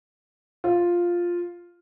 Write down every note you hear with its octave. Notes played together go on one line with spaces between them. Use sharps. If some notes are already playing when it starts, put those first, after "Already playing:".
F4